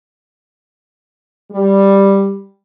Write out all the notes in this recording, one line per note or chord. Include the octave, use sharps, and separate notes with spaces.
G3